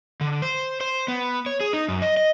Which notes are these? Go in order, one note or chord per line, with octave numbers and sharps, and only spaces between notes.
D3
C5
C5
B3
C#5
G#4
D#4
F#2
D#5
D#5